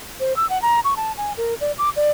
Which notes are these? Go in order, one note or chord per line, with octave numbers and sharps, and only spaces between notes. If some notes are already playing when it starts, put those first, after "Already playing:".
C5
E6
F#5
A#5
C#6
A5
G#5
A#4
D5
D6
D5